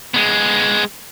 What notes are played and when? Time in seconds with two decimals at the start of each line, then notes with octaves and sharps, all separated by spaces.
0.14 G#3 B3